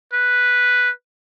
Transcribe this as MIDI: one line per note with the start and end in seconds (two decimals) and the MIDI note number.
0.13 0.90 71